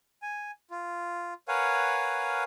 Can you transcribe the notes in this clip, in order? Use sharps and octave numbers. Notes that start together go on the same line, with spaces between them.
G#5
F4
A#4 B4 C#5 F5 F#5 G#5